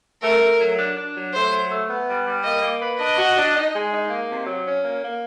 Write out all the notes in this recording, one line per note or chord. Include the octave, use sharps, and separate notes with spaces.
A3 A#4
A3
F#3
D4
D4
F#3
A3 C5
F#3
A3
B3
G3
G3
A#3 D#5
A#3
B4
D4 D#5
F#4
D4
D#4
G#3
D#4
A#3
C3
F#3
C#4
A#3
A#3